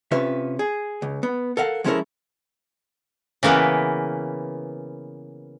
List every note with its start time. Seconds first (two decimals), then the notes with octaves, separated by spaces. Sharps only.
0.11 C3 C#4 F4 B4 E5
0.59 G#4
1.02 C#2
1.23 B3
1.57 A4 A#4 F5 F#5
1.84 F3 G#3 C#4 E4 A4 A#4
3.43 C#3 E3 A#3 B3 B4